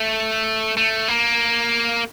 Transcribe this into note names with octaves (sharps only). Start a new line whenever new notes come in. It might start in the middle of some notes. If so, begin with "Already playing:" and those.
Already playing: A3
A3
A#3